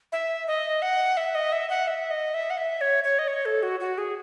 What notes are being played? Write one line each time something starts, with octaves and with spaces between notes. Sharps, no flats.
E5
D#5
F#5
E5
D#5
E5
F#5
E5
D#5
E5
F#5
E5
C#5
C#5
D#5
C#5
A4
F#4
F#4
G#4